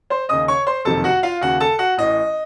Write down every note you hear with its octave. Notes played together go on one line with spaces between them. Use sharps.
C5 C6
D#2 C#3 D#5 D#6
C#5 C#6
C5 C6
F#1 F2 C3 D#3 A4 A5
F#4 F#5
F4 F5
D#2 C#3 F#4 F#5
A4 A5
F#4 F#5
A1 A2 D#5